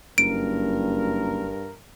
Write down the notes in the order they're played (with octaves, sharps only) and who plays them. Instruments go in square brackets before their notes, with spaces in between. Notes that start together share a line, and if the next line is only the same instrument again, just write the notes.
[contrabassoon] F#1 [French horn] G2 [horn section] A#4 [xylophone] D7